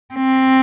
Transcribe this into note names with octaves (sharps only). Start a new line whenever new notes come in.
C4